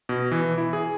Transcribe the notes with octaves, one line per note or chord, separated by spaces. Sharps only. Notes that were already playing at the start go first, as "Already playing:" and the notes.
B2
E3
E4
G#4